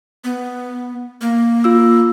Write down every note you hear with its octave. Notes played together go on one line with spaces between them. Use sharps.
B3
A#3
F4 E6